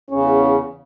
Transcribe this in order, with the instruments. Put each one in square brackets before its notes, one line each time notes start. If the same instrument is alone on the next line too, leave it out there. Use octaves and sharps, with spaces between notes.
[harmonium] E2 C#3 [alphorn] C#4